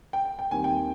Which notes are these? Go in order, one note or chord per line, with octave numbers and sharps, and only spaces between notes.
G5
G5
G5
D#2 D#3 G3 C4 G#5
G5